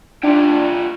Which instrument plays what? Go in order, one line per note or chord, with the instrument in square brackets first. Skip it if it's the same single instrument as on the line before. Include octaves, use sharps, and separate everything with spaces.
[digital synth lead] D4 [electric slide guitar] F4 E5 G5